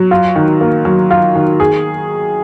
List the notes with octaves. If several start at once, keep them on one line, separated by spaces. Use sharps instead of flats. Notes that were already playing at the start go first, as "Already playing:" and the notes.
Already playing: F#3
F4
D#3
A#3
F#3
F4
D#3
G#4